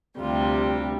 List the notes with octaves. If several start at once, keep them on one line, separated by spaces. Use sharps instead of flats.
D2 C3 G3 F4